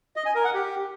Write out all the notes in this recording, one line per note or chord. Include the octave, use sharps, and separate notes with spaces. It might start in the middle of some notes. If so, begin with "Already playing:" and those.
D#5
G#5
A#4
F#5
G4